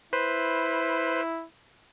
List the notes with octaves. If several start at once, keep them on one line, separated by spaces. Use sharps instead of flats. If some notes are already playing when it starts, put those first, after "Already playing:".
E4 B4 C5